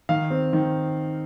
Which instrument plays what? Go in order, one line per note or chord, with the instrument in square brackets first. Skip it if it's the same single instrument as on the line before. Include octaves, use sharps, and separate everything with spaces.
[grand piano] D#3 F5
C4
D#3